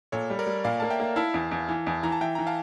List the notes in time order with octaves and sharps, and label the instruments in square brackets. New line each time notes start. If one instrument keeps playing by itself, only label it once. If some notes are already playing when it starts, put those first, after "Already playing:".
[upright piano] A#2 [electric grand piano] A4 C#5
[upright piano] G3
[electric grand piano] A#4 D5
[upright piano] G3
[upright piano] A#2 [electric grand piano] D5 F5
[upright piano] A#3 [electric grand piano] A5
[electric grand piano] E5 G5
[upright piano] A#3
[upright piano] E4 [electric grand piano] F5 A5
[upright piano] E2
E2
E3
E2
[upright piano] E3 [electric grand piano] A#5
[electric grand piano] A5
[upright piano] E3 [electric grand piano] E5 G5
[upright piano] E3 [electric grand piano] A#5
[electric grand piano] F5 A5